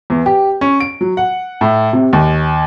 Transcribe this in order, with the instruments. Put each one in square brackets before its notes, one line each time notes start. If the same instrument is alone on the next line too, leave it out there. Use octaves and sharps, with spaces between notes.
[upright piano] E2
G4
C#4
D7
F#3
F#5
A2
C3
D#2